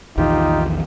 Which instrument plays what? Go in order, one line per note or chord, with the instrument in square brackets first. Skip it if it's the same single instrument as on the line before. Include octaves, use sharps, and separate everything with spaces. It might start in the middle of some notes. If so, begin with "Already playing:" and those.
[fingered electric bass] A#1 E2 D#3 [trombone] D#4 [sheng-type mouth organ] F4 G4